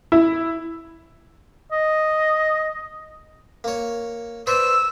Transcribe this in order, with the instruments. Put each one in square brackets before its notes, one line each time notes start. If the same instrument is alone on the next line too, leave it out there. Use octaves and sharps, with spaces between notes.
[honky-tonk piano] E4
[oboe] D#5
[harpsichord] A#3 C#5
[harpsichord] B4 C5 D5 [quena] E6